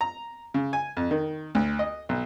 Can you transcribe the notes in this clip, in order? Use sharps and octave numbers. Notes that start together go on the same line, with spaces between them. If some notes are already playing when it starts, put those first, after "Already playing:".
A#5
C#3
G#5
F2
D#3
D2
D#5
B1